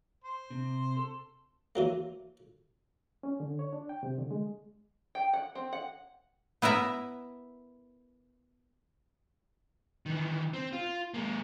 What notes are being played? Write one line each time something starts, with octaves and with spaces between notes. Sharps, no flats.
C5
C3
A4
E3 F#3 A#3
C#4
D3
C#5
D4
G5
C3
D3
G#3
G5
F#5
C4
F#5
B3 E4 A#4 E5 A#5
D#3 E3
C4
F4
G#3 A#3